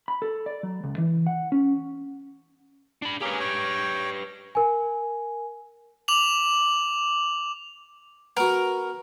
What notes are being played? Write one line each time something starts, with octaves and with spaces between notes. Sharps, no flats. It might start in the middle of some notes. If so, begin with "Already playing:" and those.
B5
A4
D5
F#3
C#2
E3
F#5
C#4
D4 B5
A#3 C#4 G4 G#4 B4
C#5 G5
A#4 G#5
D6 F7 F#7
B3 F#4 A#4